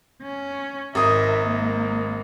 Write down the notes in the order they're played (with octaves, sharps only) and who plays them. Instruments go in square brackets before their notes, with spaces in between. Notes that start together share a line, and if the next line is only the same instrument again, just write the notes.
[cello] C#4
[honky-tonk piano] G#1 D#6 [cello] A#4 E5
[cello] G#3 A#3